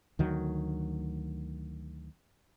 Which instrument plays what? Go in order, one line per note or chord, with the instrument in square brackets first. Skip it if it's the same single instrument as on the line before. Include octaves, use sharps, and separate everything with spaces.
[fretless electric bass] D2 D#3 F#3